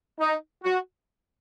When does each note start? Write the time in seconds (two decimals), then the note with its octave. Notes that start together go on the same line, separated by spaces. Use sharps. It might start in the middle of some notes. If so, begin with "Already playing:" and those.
0.19 D#4
0.63 F#4